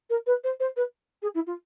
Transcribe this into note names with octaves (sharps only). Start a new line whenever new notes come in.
A#4
B4
C5
C5
B4
G#4
E4
F4